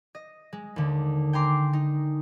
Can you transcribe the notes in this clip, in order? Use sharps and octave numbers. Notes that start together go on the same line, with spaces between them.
D#5
G#3
D#2 D3
G5 G#5 A#5 C6 D6
D#4